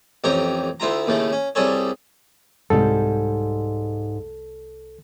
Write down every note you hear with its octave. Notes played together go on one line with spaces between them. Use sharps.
A1 F2 G4 C#5 A#5
D2 E4 F4 A#5
D#2 A2 C#3 A3
C#4
C2 G3 G#4 A4 C#5
C2 G#2 G3 A4